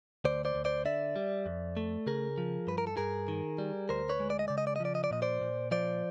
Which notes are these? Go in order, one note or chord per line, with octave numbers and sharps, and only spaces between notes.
D2 C5 D5
C5 D5
D2
C5 D5
D3 D5 E5
G3
F2
A3
C#3 G#4 A#4
F3
G2 B4
A#4
A4
G2 G#4 A#4
D#3
G3
D2 A#4 C5
B4 C#5
G#3
D5
D#5
C#3 D5
D#5
D5
D#5
F3 D5
D#5
D5
A#2 D#5
C5 D5
A#2
F3 C5 D5